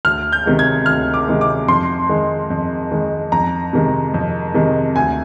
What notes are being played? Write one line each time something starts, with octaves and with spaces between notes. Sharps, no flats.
D2 F6
G6
C3 D#3 G#3
G#6
D2 F6
D6
C3 D#3 G#3
D6
F2 C6
D#3 G#3
F2
D#3 G#3
F2 A#5
C3 D#3 G#3
F2
C3 D#3 G#3
D2 G#5